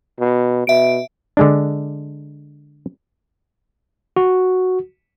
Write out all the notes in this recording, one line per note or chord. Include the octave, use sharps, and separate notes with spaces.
B2
B2 E5 D7
D3 G#3 D4
F#4